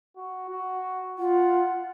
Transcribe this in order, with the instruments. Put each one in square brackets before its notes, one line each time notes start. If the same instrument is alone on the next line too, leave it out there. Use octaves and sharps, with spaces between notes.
[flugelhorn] F#4
F#4
[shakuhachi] F4 [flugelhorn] F#5